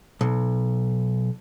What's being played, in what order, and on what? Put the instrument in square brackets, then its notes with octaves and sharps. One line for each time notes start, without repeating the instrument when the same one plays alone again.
[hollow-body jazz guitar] B1